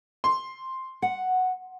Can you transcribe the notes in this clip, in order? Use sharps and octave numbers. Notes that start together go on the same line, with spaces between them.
C6
F#5